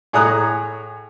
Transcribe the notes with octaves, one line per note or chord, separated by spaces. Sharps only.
A2 G#4 C#5 A#5 D#6 F#6